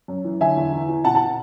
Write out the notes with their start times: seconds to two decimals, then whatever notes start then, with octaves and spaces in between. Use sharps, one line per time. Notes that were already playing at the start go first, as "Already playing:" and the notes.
0.08 F#2
0.25 E3
0.41 D3 E5 G#5
0.56 E2
0.72 E3
0.88 E3
1.04 B2 F#5 A5
1.15 F#5 A5